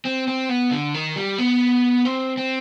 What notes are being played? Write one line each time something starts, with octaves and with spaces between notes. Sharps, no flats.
C4
C4
B3
D3
D#3
G3
B3
C4
C4